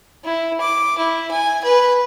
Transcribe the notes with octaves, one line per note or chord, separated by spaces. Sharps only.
E4
D6
E4
G#5
B4